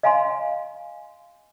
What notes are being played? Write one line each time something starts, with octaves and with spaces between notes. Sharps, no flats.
D#5 F5 G#5 A#5 C6